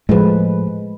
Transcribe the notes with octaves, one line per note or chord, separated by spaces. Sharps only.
A2 F3 G#3 B4